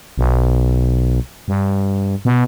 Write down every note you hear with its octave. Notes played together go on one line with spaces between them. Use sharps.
B1
G2
B2